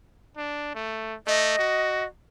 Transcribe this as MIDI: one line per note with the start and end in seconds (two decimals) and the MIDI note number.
0.37 0.70 62
0.75 1.15 57
1.27 1.55 57
1.27 2.04 75
1.59 2.06 66